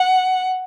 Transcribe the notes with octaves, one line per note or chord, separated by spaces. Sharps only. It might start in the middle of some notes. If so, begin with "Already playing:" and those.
Already playing: F#5